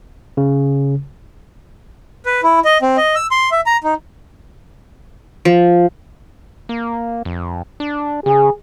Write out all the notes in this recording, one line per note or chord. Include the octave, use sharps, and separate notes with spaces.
C#3
B4
E4
D#5
C4
D#5
E6
C6
E5
A#5
D#4
F3
A#3
F2
D4
C#3 G#4